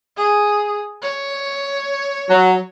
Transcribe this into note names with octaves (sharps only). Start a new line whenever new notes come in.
G#4
C#5
F#3 F#4